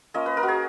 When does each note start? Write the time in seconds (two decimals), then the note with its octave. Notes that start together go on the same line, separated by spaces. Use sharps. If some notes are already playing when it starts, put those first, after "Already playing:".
0.14 A#3 C#4 F4 D#5
0.26 B4
0.37 A#4
0.43 F#4
0.48 G#4